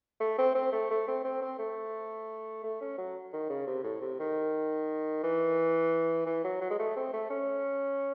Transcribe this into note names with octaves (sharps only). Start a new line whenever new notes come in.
A3
C4
C4
A3
A3
C4
C4
C4
A3
A3
C#4
F#3
D#3
C#3
C3
A2
C3
D#3
E3
E3
F#3
F#3
G#3
A3
C4
A3
C#4